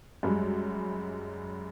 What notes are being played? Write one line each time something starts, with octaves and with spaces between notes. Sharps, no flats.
F#2 G3 G#3